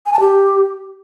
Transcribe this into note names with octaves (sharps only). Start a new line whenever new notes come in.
G#5
A5
G4